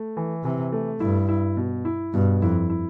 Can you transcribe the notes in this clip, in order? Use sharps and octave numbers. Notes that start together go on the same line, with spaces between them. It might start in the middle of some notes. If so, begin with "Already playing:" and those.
Already playing: A3
E3
C3 E3
A3
G2 E4
E4
B2
E4
G2 B2
F2 E4
E4